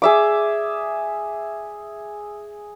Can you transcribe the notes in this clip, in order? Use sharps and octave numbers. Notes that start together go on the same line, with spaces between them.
G#4 E5 D6